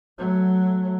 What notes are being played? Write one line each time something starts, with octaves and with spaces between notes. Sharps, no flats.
F#3 A3